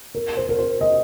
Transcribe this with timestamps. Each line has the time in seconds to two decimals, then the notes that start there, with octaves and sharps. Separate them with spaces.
0.15 A#4
0.37 C5
0.49 A#4
0.59 C5
0.81 D#5